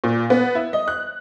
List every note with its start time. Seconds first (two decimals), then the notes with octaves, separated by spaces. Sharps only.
0.04 A#2
0.30 B3
0.55 E4
0.73 D#5
0.88 F#6